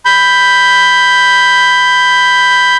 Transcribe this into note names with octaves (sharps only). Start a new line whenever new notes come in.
B5 G6